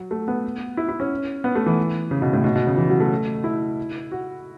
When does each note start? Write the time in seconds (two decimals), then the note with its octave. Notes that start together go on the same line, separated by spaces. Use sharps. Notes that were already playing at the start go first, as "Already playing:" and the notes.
Already playing: F#3
0.11 A3
0.28 B3
0.77 E4
0.89 E4
1.00 C#4
1.44 B3
1.55 A3
1.66 E3
2.11 C#3
2.22 B2
2.33 A2
2.44 B2
2.56 B2
2.67 C#3
2.77 E3
2.90 F#3
3.00 A3
3.44 E4
4.12 F#4